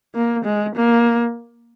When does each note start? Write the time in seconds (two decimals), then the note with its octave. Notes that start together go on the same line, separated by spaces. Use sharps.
0.15 A#3
0.45 G#3
0.76 A#3